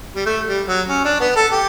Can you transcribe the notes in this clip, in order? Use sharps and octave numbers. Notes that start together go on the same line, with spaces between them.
G3
A3
G3
F#3
C#4
D4
B3
A4
G4